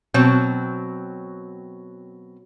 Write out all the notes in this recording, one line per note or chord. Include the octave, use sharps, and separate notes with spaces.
B2 F#3 C4